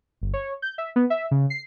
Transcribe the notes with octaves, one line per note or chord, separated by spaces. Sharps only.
G1
C#5
G6
E5
B3
E5
C#3
C7